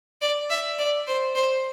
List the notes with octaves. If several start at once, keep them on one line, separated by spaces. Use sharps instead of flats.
D5
E5
D5
C5
C5